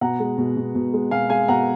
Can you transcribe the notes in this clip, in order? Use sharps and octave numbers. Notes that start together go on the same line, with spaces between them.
B2 F#5 A#5
G#3
B2
B2
B2
G#3
B2 F5 G#5
G#3 F5 G#5
B2 F#5 A#5